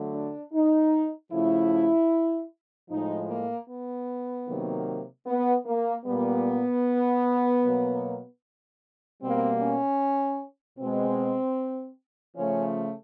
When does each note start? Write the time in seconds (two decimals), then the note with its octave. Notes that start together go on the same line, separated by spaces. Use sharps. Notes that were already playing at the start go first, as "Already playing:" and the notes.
Already playing: D3 F#3 A3
0.14 D4
0.53 D#4
1.32 C#3 F3 A3 E4
2.90 A2 F3 G#3 D#4
3.29 A#3
3.69 B3
4.48 C3 D#3 F#3 A#3
5.26 B3
5.66 A#3
6.05 A#2 G3 A#3 B3
7.62 B2 F#3 A#3
9.20 B2 G3 A#3 C4
9.60 C#4
10.79 B2 G#3 C4
12.36 C#3 F3 A3 C#4